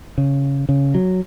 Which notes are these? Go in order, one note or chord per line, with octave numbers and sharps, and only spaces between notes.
C#3
C#3
F#3